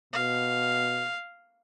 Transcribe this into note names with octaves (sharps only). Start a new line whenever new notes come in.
B2 F5